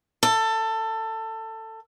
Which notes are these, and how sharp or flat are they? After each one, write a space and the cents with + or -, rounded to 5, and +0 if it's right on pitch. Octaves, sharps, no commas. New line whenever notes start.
A4 +20